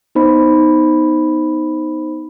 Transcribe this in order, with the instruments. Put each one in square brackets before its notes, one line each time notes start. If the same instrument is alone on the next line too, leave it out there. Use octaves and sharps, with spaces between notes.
[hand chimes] B3 D#4 C5 B5